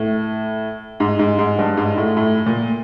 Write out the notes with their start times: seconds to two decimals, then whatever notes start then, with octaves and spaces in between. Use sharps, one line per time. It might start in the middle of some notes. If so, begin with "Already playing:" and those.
Already playing: A2
1.00 G#2
1.19 G#2
1.39 G#2
1.59 G2
1.77 G#2
1.97 A2
2.17 A2
2.46 A#2